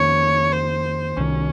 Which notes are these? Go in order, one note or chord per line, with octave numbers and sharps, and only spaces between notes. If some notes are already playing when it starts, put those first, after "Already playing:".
Already playing: F2 D#3 A#3 C#4 C#5
C5
C2 C3 D#3 C#4